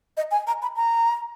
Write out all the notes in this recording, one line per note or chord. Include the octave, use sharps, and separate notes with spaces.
D#5
G#5
A#5
B5
A#5